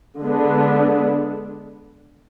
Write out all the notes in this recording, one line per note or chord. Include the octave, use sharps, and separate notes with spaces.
D3 G#3 B3 D4